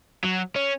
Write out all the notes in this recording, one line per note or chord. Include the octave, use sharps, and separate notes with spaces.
F#3
C#4